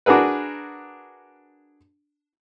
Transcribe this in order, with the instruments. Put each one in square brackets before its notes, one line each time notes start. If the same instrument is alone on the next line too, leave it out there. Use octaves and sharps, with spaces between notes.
[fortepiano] D4 F#4 G#4 A#4 B4